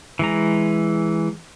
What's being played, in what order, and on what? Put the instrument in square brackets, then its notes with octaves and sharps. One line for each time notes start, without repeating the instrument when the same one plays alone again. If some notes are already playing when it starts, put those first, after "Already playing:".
[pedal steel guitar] E3 G#3 A#5